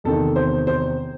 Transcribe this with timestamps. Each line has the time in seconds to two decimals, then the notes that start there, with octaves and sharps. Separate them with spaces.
0.04 E2 C3 D#3 A4
0.36 C5
0.67 C5